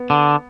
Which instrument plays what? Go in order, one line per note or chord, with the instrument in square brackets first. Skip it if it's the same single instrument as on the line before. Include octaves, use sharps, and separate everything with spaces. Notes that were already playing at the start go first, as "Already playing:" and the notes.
Already playing: [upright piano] B3
[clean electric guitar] D3